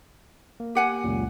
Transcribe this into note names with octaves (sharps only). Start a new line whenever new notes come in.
A#3
G4 F#5 G#5
C#2 F#2 A#2